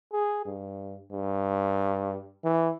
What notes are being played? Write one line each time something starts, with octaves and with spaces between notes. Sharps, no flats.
G#4
G2
G2
E3